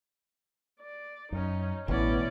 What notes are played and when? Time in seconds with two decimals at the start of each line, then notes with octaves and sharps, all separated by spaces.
0.81 D5
1.32 F#2 C#4 D#4
1.88 A1 B2 E3 A3 B3 C#4 E4 D5